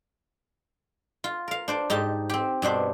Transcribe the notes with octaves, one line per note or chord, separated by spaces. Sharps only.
F4
A#4 F5
D4 C5 D5
G#2 D#4 G4 A5
C4 G4
G2 B2 D4 C5